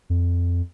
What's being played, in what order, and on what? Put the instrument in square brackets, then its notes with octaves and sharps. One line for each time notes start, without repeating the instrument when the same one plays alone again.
[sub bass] F2